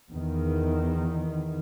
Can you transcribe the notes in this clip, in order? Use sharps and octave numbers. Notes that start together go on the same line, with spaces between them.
E2 D#3